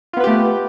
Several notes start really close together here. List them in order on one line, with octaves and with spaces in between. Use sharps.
F4 B3 B4 G4 A3